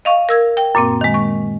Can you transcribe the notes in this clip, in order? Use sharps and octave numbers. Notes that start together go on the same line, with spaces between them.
D#5 F5 C#6
A#4 E6 G#6
G5
F#2 A#2 A#3 C4
D#3 G#3
C#6